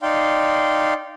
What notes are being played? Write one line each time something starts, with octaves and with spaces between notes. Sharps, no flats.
D#4 D5 F5 G5 C6